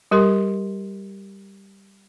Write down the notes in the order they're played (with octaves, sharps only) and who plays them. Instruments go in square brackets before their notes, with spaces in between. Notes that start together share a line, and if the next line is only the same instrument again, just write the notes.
[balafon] G3 G4 A#4 C6